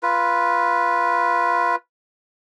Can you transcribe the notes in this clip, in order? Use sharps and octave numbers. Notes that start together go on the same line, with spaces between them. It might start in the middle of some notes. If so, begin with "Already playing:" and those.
F4 B4